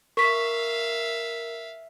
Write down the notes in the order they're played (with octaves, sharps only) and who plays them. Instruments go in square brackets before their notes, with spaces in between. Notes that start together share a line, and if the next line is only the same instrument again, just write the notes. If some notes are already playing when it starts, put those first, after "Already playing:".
[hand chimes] A#4 [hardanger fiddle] E5 F5 [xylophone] C#6 B6